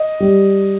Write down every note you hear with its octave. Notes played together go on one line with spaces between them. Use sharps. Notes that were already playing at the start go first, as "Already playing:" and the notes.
Already playing: D#5
G3